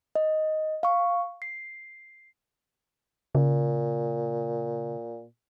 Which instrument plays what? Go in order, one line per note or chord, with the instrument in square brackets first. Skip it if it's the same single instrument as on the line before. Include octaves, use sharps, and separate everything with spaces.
[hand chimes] D#5
F5 C#6
C7
[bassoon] A#2 [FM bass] C#3